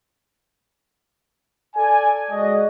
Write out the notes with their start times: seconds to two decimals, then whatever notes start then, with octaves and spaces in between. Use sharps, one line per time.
1.76 A4 D5 G#5
2.31 G#3 F#4 D5 D#5